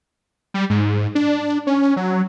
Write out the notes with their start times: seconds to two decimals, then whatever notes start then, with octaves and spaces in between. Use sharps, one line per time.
0.54 G3
0.70 G#2
1.15 D4
1.67 C#4
1.97 F#3